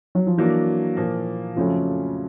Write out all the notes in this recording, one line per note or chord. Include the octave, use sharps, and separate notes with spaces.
F#3
F3
E3 F#3 A#3 D4
A#2 F3 A#3
F2 C#3 F3 F#3 A3 C#4